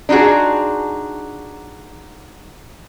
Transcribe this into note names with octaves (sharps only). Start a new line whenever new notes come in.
D4 D#4 F4 F#4 G#4